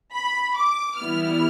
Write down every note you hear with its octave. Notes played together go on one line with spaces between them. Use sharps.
B5
D6
E3 G3 B3 E4 F6